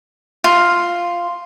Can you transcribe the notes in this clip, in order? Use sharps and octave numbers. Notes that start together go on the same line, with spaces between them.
F4